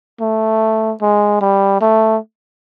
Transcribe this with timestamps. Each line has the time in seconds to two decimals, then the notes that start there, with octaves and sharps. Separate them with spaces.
0.21 A3
1.02 G#3
1.41 G3
1.81 A3